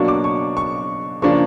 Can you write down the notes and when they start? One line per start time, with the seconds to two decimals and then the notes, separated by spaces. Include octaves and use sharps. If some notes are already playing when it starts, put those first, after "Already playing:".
Already playing: B2 F#3 A#3 D4 C#6
0.08 D6
0.24 C#6
0.57 C#6
1.22 C#3 F3 A#3 D4 C#6